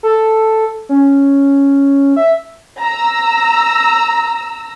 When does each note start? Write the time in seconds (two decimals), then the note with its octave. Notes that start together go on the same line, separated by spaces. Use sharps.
0.03 A4
0.89 C#4
2.16 E5
2.79 A#5 E6